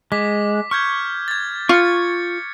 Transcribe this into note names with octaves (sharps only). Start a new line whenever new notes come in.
G#3 D6 B6
C#6 F6 G6 G#6
G#6 A6
F4 C#6 A6 C#7